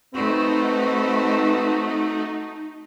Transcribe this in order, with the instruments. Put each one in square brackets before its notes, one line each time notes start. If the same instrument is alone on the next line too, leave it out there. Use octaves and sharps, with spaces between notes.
[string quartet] A3 F#4 [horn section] C4 [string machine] D#4 [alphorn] B4